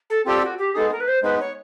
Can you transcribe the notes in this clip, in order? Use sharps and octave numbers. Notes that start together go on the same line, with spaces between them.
A4
C4 F4 G4 A4 D5 G5
F#4
G4
G#3 B3 D#4 G#4 A4
A#4
B4
C5
G#3 B3 D#4 B4
C#5